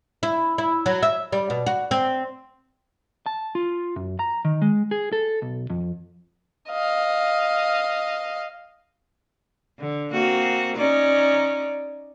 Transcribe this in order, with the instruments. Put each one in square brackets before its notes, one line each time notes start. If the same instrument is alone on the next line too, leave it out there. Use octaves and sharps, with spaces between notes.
[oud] E4
E4
F#3
E5
G3
B2
F#4
C4
[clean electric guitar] A5
F4
F#2
A#5
D#3
G#3
G#4
A4
B1
F2
[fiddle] D#5 F5
[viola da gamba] D3
A#3 C4 F#4
C#4 D#4 D5